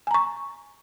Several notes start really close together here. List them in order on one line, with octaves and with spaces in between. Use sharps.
G#5 A#5 C#6